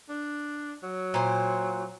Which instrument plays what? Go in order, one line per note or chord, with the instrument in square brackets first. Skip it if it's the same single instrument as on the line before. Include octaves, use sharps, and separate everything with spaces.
[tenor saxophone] D4
F#3
[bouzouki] A#2 C5